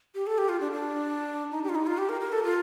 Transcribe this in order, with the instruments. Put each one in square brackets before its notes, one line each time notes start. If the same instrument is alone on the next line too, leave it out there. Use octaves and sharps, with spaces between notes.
[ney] G4
A4
G4
F4
D4
D4
D#4
G4
F4
D#4
F4
G4
A#4
A#4
A4
F4